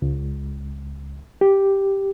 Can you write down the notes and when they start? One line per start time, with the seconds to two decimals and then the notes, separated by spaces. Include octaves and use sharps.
0.02 C#2
1.41 G4